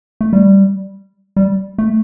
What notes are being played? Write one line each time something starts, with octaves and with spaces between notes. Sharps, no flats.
A3
G3
G3
A3